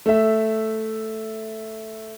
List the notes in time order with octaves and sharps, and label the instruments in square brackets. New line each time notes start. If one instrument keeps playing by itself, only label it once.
[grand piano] A3 E5